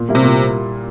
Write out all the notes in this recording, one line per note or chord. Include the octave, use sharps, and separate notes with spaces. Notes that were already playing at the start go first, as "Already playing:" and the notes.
Already playing: A#2
G3 A#3 E4
C3
A#2